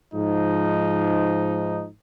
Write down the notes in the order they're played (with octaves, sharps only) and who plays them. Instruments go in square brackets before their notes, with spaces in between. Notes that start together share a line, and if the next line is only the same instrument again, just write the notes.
[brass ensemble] G#2 F3 D#4